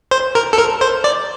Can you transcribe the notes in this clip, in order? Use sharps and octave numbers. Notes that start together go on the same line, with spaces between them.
C5
A#4
A4
A#4
C5
D5